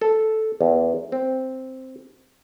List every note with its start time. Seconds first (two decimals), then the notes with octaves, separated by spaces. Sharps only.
0.01 A4
0.61 E2
1.12 C4